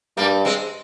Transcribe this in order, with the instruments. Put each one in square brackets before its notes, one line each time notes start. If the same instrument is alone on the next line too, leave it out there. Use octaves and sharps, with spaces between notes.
[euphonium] G2 [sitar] G3 A#3
[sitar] G#3 C4